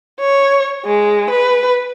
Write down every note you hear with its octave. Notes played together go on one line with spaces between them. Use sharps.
C#5
G#3
B4